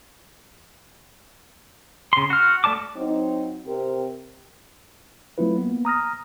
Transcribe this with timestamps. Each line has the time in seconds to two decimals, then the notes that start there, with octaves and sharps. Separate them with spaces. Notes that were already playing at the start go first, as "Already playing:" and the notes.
2.13 C#3 C6
2.30 F#4 F6
2.64 A3 D5 A5 D6
2.97 F#3 C4 D#4
3.67 C3 C4 G4 A#4
5.38 F#3 A3 C4 E4 F4 B4
5.58 A#3 B3
5.85 A#5 D#6 F6 A#6